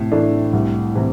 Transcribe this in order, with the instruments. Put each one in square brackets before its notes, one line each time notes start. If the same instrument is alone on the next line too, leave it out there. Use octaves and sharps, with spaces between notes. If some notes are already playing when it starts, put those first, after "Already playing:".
Already playing: [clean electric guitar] A2 [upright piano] C3
[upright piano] E3 A3 D4
C2
C3 E3